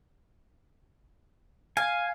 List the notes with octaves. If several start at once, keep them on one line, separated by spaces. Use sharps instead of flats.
F5 G#5